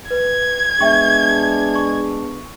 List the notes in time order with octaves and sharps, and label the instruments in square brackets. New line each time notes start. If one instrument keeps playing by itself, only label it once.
[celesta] B4 [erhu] G#6
[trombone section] G#3 B3 D4 [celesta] E5 G5 C#6
[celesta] C#6